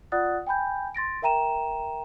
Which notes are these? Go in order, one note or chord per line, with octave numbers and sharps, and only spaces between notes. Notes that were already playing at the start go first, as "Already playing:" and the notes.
F4 D5 F#5 D#6 F#6 A6
G5 G#5 B5 G6
C6 A6 A#6 D7
A#4 E5 G5 A#5 D#7 E7